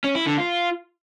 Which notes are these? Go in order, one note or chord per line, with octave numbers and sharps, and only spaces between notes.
C#4
E4
D3
F4